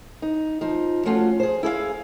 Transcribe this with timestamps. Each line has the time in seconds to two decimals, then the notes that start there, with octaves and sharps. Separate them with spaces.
0.22 D#4
0.61 F3 D#4
1.05 F3 A3 C#4 F4 F#4
1.40 G#4 C5
1.63 E4 G#4 C#5 F5